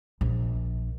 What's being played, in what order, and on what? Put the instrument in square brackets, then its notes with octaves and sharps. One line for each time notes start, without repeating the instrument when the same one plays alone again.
[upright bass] A#1